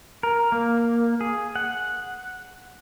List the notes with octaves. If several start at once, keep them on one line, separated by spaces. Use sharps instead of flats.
A#4
A#3
G#4
F#5